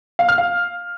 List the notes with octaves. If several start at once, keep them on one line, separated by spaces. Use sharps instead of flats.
F5
F6
F5